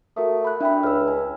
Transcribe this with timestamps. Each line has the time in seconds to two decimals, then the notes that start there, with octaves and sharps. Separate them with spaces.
0.17 A3 F#4 A#4 D#6
0.45 B5 F#6
0.61 D4 E4 G5 B5
0.83 C#2 E6 F6
1.08 G#5